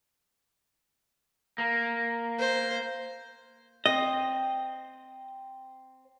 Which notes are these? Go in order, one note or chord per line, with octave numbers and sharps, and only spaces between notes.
A#3
C5
C4 D#5